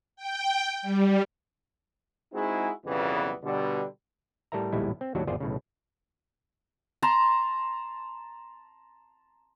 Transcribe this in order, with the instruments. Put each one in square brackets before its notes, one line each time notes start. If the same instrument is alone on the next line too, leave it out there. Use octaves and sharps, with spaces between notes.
[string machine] G5
G3
[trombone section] G#3 C4 D#4 E4 F#4 G#4
B1 F2 C#3 E3 G3 B3
B2 D3 G3
[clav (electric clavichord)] A2 G3 A4 A#4 E5 A#5
A#1 D#2 A2 G3 G#3 E4
C4
D#2 A2 F#3 D4 F#4 G4
G#1 E2 F4 G#4 C5 D5
B1 A2 C#3
[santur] A5 A#5 C6